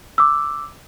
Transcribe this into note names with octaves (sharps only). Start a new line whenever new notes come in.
D6 E6